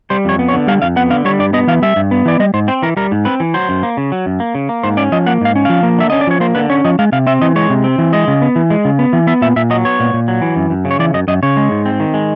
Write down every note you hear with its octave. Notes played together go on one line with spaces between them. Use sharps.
G3 C5
F2 C#5
B3
C#5
D3
G3 F5
F2 F5
B3 F#5
D3 F5
G3 C#5
G2 D5
B3 D#5
E3 F5
G3 E5
G2
B3
E3 D5
G3 D#5
G#2 C5
C4 C5
E3 A#4
G3 A#4
G#2
C4 B4
E3
F#3 C5
F#2
A#3
C#3
F#3
F#2
A#3
C#3
A#3
G#2 C5
C#4 D5
F3 D#5
A#3 F#5
G#2 F5
C#4
F3 F5
A#3
D3 E5
C#4 D#5
D5
F3 C#5
A#3 C5
D3 B4
C#4 C#5
F3 D#5
G#3 F5
C3 F5
C4 E5
E3 D#5
G#3 C#5
C3
C4
E3
G#3 D#5
C#3
B3
E3
G#3
C#3
B3
E3
B3 E5
A#2 E5
A#2 E5
F#3 D#5
B3 C#5
A#2
A#2
F#3
E3
F#2
F#2
C#3
C#5
E3 D5
F#2 D#5
F#2 D#5
C#3 C#5
G#3
G#2
C4
D#3
G#3